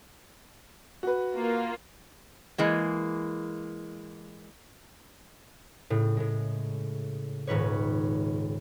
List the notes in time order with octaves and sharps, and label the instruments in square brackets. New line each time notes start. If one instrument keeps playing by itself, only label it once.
[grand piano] F#4 B4
[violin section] A#3 F4
[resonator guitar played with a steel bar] E3 G#3 A#3
[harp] A2 C#3
A2 G#3
D#1 G#2 B4 C#5